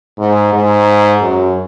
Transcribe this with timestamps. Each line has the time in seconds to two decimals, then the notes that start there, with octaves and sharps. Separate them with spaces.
0.19 G#2
0.53 G#2
1.22 F#2